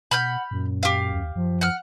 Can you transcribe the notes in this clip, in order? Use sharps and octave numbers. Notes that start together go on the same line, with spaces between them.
B2 F#5 B5 F6 G6
F#2 A#2
G4 F5
D#2
F#2 F3
F#5 F6